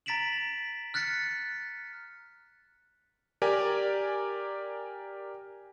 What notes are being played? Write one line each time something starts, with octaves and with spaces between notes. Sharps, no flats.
A#5 A6 B6 D7 E7 F#7
F6 F#6 A6 B6 C#7
G4 A#4 D5 G#5